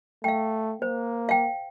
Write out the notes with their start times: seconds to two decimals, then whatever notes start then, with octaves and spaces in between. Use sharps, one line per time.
0.24 A3 F5 G5
0.82 A#3 C5
1.29 F5 G5